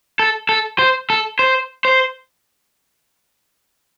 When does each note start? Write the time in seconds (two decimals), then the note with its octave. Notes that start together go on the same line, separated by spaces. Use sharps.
0.19 A4
0.49 A4
0.79 C5
1.10 A4
1.39 C5
1.85 C5